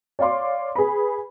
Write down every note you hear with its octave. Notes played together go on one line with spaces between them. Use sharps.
C#5 D5 F5 C6 D6
G#4 B4 B5